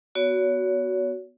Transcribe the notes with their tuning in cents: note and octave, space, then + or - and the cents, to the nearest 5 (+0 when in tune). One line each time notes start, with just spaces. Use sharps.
B3 +0 F#4 +5 C#5 +35